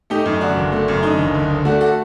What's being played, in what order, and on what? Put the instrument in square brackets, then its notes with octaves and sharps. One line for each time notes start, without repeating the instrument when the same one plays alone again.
[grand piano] A3 D#4 G4
F#2 D#4
D3 D4 F#4
F#1
A3
F#2
D3 D#4
F#1
D2
D3
A3 D4 F#4
F#4 A4